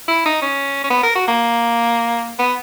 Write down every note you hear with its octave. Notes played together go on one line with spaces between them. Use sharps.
E4
D#4
C#4
C#4
B3
A#4
F#4
A#3
B3